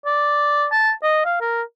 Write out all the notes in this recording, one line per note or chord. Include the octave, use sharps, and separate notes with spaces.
D5
A5
D#5
F5
A#4